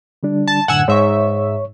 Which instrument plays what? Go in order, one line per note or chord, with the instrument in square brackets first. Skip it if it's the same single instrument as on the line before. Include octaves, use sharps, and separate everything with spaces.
[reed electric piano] D3 G3 D4
[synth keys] A5
[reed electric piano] F#2 A2 D3 [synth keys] F#5 G#5 E6
[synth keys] G#2 E5 [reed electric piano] C#5 C#6